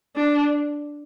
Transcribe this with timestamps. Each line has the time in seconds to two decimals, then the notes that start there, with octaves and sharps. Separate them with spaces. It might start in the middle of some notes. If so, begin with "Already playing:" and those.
0.16 D4